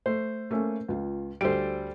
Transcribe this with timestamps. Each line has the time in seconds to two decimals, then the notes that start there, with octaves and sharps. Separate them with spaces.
0.06 A3 C5
0.51 A3 A#3 C#4
0.88 C#2 F4
1.41 D2 G3 A4 C5 D7